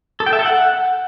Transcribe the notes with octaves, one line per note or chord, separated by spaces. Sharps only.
A4
G5
E5
A4
F#5